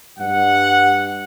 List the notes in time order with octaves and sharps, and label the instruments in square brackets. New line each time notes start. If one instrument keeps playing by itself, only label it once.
[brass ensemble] G2 F#5